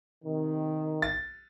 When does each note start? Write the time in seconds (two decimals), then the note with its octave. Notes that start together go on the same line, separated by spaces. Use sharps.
0.24 C3 D#3
1.02 A6